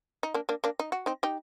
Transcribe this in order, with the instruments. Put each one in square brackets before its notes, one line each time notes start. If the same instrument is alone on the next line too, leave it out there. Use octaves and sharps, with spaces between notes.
[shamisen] D#4
A#3 D4
A#3 D4
A#3 D4
D#4
F#4
C4 D#4
D#4 G4